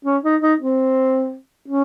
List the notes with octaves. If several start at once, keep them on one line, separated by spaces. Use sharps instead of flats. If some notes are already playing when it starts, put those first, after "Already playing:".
C#4
D#4
D#4
C4
C#4